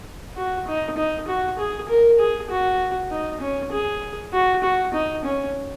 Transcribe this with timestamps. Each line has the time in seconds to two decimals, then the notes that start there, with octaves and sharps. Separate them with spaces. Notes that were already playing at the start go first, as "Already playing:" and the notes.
0.37 F#4
0.67 D#4
0.97 D#4
1.27 F#4
1.58 G#4
1.89 A#4
2.19 G#4
2.50 F#4
3.11 D#4
3.41 C#4
3.72 G#4
4.33 F#4
4.63 F#4
4.94 D#4
5.25 C#4